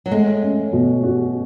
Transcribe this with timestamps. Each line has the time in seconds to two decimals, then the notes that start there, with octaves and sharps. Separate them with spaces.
0.06 F#3
0.11 G#3 A3
0.42 C#4
0.73 B2
1.03 F#4